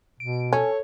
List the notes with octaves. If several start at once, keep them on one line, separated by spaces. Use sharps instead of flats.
B2 D7
C#4 A4 C#5